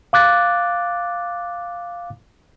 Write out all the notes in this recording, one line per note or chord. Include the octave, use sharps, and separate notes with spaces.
F5 D6 F#6 A6